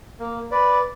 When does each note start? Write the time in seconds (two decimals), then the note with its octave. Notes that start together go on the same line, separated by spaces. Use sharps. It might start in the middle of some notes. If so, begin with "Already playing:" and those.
0.20 A#3
0.51 B4 D5